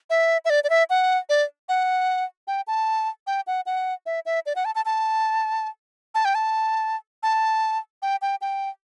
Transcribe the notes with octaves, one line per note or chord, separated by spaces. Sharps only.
E5
E5
D5
D5
E5
F#5
D5
F#5
G5
A5
G5
F#5
F#5
E5
E5
D5
F#5
A5
A5
A5
A5
G5
A5
A5
G5
G5
G5